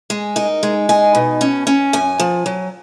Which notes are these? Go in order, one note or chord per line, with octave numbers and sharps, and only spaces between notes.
G#3
D#4 A#4
G#3
D#4 G#5
B2
C#4
C#4
F#2 G#5
F3
F#3